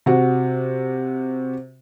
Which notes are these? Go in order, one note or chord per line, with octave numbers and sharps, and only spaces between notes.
C3 F#4